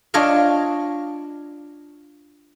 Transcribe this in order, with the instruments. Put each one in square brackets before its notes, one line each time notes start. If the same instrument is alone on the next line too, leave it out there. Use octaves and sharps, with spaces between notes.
[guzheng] D4 F4 C#5 D#5 F5